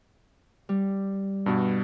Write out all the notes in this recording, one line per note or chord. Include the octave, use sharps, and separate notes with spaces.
G3
G2 B2